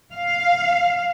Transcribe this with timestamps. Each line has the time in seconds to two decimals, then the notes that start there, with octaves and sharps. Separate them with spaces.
0.14 F5